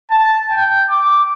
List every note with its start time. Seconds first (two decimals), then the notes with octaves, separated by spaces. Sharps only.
0.10 A5
0.50 G5
0.90 D6